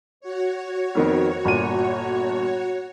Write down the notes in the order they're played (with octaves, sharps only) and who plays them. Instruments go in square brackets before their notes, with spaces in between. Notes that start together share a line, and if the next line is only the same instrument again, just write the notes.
[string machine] F#4 C#5
[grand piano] F2 D#3 B3
G1 A#2 D#7